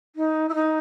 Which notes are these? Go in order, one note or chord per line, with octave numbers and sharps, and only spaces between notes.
D#4
E4
D#4